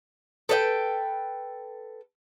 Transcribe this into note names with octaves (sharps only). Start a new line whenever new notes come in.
A4 B4 D#5 G5